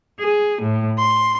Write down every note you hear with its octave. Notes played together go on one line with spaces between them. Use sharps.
G#4
A2
C6